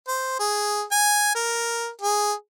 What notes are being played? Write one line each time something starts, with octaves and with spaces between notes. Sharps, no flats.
C5
G#4
G#5
A#4
G#4